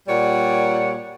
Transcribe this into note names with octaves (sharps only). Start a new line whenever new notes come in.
A#2 G3 C#5 D5 F#5